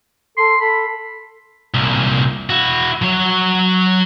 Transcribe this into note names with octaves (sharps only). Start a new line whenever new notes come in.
A4 C6
A4 B5
C2 A#2
E4 F#4
F#3 C#5